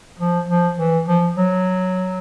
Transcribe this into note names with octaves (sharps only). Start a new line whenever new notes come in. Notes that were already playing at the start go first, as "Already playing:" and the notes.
F3
F3
E3
F3
F#3